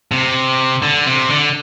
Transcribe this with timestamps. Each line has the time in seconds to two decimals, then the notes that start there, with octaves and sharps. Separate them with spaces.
0.12 C3
0.83 D3
1.06 C3
1.30 D3